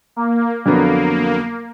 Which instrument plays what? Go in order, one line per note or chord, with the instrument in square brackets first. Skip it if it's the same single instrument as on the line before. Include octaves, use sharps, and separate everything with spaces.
[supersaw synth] A#3
[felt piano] F2 D3 F#3 B3 [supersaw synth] A#3